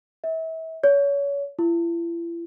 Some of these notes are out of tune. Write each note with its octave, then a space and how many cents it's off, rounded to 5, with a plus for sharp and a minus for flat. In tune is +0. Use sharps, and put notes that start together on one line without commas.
E5 -35
C#5 +30
E4 +40